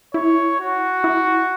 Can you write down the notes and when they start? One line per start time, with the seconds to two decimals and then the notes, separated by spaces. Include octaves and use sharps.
0.14 E4 C#5
0.59 F#4
1.04 E4